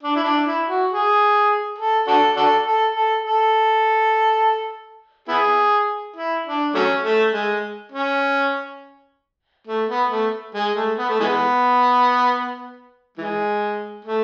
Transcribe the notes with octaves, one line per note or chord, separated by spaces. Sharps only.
D4
E4
D4
E4
F#4
G#4
A4
D4 F#4 A4
D4 F#4 A4
A4
A4
A4
B3 E4 G#4
E4
D4
F#3 A3 C#4
A3
G#3
C#4
A3
B3
A3
G#3
A3
B3
A3
E3 G#3 B3
E3 G#3
A3